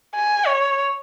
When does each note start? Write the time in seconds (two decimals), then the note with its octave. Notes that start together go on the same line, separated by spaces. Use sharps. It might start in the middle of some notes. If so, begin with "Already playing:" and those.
0.15 G#5
0.46 C#5